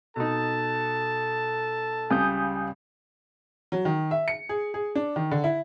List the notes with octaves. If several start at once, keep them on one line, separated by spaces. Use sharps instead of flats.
B2 D#4 A4 A5
C#2 C#3 G3 G#5 D#6 G6
F#3
D#3
E5
C#7
G#4
G#4
D4
D#3
D3
E4